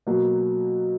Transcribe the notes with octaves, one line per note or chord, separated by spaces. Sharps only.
B2 F#3 A#3